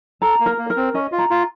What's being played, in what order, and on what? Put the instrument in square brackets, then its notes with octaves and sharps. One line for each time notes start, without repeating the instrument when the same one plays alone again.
[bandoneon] A4 [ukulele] A#5
[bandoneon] A#3
[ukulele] A#4
[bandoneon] A#3
[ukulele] A#4
[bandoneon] C4
[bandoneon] C#4 [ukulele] D#5
[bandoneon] F4
[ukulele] A#5
[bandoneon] F4